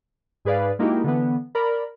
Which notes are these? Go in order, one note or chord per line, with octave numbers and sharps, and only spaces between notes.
G#2 G#4 B4 D5 F5
G#3 A#3 D#4 E4 F#4 G4
D3 E3 B3
A#4 D5 B5